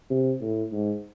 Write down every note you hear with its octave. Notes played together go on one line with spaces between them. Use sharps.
C3
A2
G#2